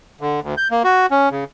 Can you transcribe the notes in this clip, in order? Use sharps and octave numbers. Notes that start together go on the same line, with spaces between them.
D3
D2
G6
A#3
F#4
C#4
C#3